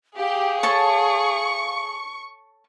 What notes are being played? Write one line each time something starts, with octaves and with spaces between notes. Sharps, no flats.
G4 G#4 F5
A4 C#5 A5 C#6